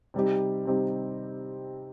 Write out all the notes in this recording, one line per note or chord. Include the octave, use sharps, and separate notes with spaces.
C3 G3 C4 D#4 G4
C3 G3 C4 D#4 G4